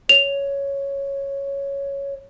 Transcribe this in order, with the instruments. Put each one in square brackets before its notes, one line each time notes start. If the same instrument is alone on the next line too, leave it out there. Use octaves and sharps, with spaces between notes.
[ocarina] C#5 [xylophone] F7